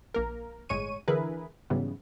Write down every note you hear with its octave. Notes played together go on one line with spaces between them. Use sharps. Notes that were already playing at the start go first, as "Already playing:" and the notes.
A#1 A#3 A#4
G1 A2 G#3 C#5 C#6 D#7
D3 E3 E4 G#4 A#4 B4
G#2 C#3 E3 F#3 G3 B3